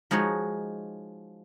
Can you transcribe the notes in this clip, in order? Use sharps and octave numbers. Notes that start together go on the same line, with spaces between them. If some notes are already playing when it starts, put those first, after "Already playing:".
F3 G#3 D#4 F#4 C#5